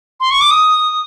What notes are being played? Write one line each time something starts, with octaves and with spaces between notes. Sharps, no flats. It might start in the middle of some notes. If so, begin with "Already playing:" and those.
C6
C#6
D6
D#6